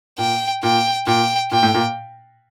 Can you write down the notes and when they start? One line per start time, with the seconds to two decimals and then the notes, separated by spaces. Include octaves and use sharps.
0.18 A#2 G5
0.63 A#2 G5
1.07 A#2 G5
1.52 A#2 G5
1.63 A2
1.74 A#2